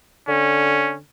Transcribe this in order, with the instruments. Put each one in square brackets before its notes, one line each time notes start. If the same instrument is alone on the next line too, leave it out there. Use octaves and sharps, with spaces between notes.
[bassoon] D3 [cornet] C#4